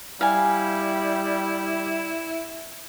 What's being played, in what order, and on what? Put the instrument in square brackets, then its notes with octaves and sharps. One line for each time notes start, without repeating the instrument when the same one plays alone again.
[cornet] G3 [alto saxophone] E4 [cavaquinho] F5 G#5